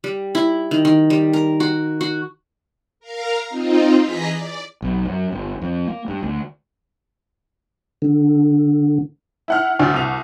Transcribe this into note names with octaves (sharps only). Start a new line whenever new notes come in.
G3
E4
D#3
D#3
G3
A#4
F#4
F#4
A#4 F5 A#5
C4 D#4 F4
E3 G#4 D#5 A#5 B6
D5
B1
F#2
G1
F2
A#3
G2
D2
D3
E4 F#5 F6
D2 D4 F#4
C2 F7